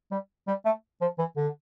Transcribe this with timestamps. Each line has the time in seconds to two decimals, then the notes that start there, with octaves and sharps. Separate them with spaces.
0.12 G3
0.48 G3
0.65 A3
1.01 F3
1.19 E3
1.37 D3